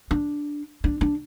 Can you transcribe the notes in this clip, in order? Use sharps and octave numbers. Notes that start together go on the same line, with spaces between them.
D4
D4
D4